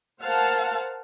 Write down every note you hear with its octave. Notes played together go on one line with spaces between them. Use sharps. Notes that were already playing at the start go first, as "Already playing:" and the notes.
A#4 C5 F5 F#5 A5